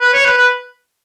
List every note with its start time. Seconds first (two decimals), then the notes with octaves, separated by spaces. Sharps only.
0.01 B4
0.13 C#5
0.25 B4
0.37 B4